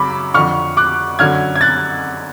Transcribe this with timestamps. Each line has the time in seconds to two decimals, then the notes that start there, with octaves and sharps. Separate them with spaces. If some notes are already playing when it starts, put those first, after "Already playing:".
Already playing: F#2 C#3 B5 D6
0.34 F2 D3 C#6 F6
0.77 D6 F#6
1.19 F#2 D3 F6 G#6
1.56 G#6
1.61 F#6 A6